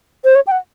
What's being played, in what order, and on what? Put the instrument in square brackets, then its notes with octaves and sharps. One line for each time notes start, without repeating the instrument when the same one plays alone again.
[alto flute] C5
C#5
G5
F#5